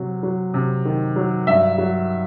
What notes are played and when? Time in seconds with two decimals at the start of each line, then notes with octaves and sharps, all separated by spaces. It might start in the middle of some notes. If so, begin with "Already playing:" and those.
Already playing: C3 F#3
0.23 F#3
0.54 C3
0.85 D#3
1.16 F#3
1.47 G2 E5
1.78 F#3